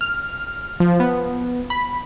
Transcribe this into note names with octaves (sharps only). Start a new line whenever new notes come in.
F6
F3
B3
B5